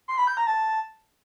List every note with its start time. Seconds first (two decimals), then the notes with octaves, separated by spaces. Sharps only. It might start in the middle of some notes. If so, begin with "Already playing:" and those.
0.08 C6
0.18 B5
0.27 G6
0.37 A#5
0.47 A5